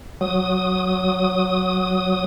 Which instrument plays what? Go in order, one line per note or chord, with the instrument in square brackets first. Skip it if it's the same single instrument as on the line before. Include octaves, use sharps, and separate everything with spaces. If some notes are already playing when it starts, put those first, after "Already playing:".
[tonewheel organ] F#3 D#6